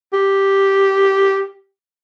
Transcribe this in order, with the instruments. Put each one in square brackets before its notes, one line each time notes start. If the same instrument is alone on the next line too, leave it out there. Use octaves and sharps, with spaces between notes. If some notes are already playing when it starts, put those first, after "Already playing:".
[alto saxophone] G4